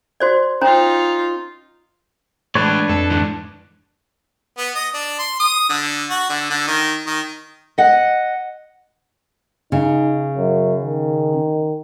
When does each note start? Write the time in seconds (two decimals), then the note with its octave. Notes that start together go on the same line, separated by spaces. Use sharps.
0.20 F#4 C5 D5
0.61 C#4 D#4 F4 C5 A#5
2.55 A2 E3 G#3 A3 D4 B4 C#5 D5
2.89 F2 A4
3.10 G#2 E3
4.58 B3
4.75 D#5
4.94 D4
5.19 C6
5.40 D#6
5.70 D3
6.10 F#4
6.29 D3
6.50 D3
6.67 D#3
7.07 D#3
7.78 D#5 F#5
9.72 C#3 D#4
10.36 F#2
10.82 D#3